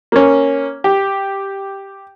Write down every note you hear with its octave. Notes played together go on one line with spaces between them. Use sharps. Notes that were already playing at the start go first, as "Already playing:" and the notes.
A#3 C#4
G4